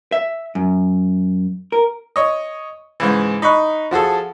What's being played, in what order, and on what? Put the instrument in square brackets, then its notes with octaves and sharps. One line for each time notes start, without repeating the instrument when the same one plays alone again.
[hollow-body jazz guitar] E5
F#2
A#4
[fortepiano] C#5 D#5
G#2 C#3 E3
D#4 B5 C#6 F#6
F3 F#4 G#4 A4